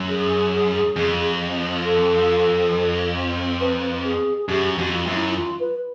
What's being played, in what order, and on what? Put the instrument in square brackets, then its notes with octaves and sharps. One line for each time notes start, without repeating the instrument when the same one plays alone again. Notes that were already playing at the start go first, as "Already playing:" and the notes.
Already playing: [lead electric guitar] F#2
[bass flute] G#4
[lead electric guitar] F2
[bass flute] A4
B4
G#4
G#4
[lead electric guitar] F#2 [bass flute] G4
[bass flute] F#4
[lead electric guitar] F2
[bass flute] F4
[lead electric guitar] F#2
[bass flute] E4
E4
F4
B4